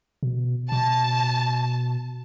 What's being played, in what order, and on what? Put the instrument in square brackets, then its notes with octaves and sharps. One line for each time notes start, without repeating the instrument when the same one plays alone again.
[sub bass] B2
[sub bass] B2 [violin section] A5